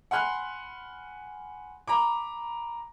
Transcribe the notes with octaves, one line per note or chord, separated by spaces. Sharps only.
F#5 G#5 B5 C6 F6 F#6
A#5 B5 D6